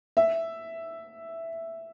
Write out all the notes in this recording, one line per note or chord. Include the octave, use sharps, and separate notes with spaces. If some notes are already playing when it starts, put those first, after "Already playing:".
E5